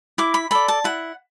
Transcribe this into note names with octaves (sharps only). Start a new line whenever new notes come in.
E4 D6
B5
A4 D5 B5
A5
E4 F#5